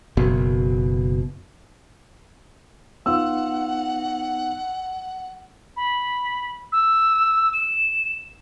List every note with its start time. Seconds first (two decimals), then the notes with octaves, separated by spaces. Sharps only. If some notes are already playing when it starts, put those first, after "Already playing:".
0.17 F#1 B2
3.06 B3 D#4 F4 F#5 E6
5.77 B5
6.72 E6
7.53 E7